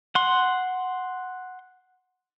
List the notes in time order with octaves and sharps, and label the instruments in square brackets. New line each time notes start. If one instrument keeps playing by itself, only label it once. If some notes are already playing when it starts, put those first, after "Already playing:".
[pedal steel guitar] F#5 C6